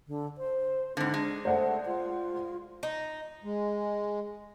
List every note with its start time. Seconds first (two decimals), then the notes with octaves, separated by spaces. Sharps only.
0.08 D3
0.38 C5
0.97 G#2 D3 C4
1.14 G#3 D4
1.45 A3 C5 D5 F#5
1.86 F4
2.83 D#4
3.44 G#3